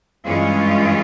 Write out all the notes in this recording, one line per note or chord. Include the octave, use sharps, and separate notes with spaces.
G2 E3 G#3 C#4 F4